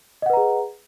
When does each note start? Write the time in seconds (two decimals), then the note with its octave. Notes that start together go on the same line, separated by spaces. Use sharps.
0.22 D#5
0.26 F#5
0.30 B4
0.33 A#5
0.37 G#4